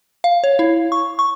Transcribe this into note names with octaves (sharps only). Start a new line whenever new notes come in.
F5
C#5
E4
C#6
C#6